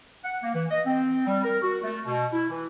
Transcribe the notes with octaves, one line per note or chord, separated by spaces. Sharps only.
F#5
A#3
E3
D#5
C4
G3
A#4
F#4
A3
B2
E4
E3